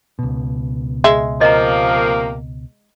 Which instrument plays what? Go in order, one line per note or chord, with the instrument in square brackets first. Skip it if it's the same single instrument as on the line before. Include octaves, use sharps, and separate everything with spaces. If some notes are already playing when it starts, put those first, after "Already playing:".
[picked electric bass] C#2 B2
[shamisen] G#3 E5
[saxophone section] C3 F3 A#3 [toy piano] D#5 A#5